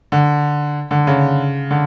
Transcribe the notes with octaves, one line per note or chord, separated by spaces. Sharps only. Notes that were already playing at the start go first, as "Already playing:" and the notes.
D3
D3
C#3
D3